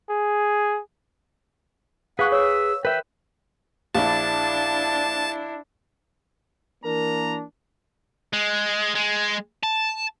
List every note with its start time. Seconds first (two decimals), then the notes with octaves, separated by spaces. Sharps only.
0.10 G#4
2.19 G#4 B4 F5 F#5 C#6
2.32 C#5 E6
2.85 A#4 B4 E5 G5
3.95 A#1 D4 E4 A5
6.85 E3 A#3 D4 A#4 A#5
8.33 G#3
8.95 G#3
9.63 A5